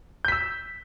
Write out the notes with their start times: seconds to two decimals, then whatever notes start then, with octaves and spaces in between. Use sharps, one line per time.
0.25 G6
0.28 B6
0.32 E6